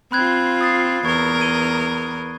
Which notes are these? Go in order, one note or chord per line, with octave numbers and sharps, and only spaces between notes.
C4 F4 B5 F#6 G#6
D#6 A6 C7
E2 A#4 C#6 G#6
G#6 D#7 G7